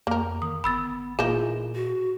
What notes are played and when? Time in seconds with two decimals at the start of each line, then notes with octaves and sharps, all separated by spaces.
0.07 F2 A#3 A#4
0.42 D#3 D#6
0.64 G1 B3 B5 E6 A6
1.19 A#2 E3 A#3 D#4 F4 G#4
1.75 F#4